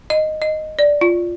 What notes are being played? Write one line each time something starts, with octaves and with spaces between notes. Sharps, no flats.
D#5
D#5
D5
F4